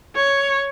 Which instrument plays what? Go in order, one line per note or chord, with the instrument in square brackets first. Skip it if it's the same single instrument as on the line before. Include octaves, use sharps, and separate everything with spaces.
[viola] C#5